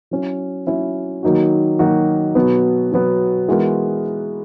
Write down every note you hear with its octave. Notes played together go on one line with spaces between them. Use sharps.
F#3 C#4 E4
F#3 C#4 E4
D#3 F#3 A#3 D#4 F#4
D#3 F#3 A#3 D#4 F#4
B2 F#3 B3
B2 F#3 B3
E3 G#3 B3 F#4 A#4